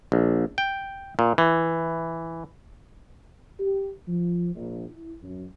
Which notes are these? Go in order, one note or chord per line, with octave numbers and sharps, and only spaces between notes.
A#1
G5
A#2
E3
G4
F3
A#1
E4
F#2